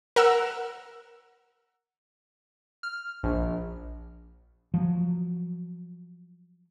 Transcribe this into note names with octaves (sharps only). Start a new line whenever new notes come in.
A#4 F#5 E6
F6
A#1
F3 F#3